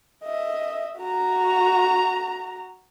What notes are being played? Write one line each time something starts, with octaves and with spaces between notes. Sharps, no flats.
D#5 E5
F#4 A#5